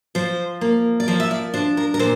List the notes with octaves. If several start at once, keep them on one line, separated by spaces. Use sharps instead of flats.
F3 C5
A#3
D5
F3 C5
E5
D5
D4 C5
A#4
A#4
A#2 C5